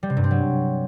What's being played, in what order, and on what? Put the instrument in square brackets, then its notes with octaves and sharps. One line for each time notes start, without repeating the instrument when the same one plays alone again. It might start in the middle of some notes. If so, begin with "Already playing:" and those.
[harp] G3
C3
G2
C4
F#3